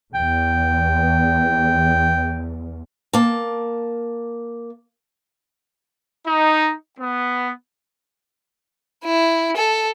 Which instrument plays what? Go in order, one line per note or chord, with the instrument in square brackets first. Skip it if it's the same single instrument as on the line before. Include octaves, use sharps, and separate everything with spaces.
[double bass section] E2 [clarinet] G5
[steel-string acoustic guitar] A#3 A5
[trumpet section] D#4
B3
[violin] E4
A4